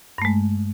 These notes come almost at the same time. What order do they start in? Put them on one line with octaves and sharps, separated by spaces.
G2 A3 G#3